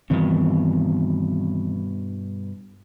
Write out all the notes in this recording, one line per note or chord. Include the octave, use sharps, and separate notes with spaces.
G2 B2 D#3 E3 C4